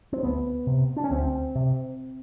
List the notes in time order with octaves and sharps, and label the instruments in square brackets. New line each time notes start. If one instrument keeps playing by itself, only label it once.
[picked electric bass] C4
D2 B3
C3
D4
C#4
D2 C4
C3